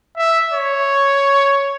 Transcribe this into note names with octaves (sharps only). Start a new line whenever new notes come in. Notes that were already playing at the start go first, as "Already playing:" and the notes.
E5
C#5